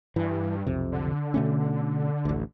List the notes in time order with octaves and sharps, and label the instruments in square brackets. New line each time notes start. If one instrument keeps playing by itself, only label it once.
[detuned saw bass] G2 [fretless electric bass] E3
[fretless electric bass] B1 F2 C3
[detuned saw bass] D3
[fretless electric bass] B2 A3 C#4
A1 D2